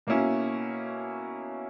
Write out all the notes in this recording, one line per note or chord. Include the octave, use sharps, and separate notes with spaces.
B2 A#3 C#4 E4